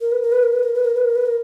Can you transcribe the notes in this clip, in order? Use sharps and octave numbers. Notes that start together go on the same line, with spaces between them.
A#4
B4
A#4
B4
A#4
B4
A#4
B4
A#4
B4
A#4
B4
A#4